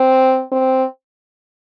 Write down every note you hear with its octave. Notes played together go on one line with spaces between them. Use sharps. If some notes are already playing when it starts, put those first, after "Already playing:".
Already playing: C4
C4